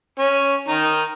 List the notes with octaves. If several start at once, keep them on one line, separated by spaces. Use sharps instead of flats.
C#4
D#3 D#4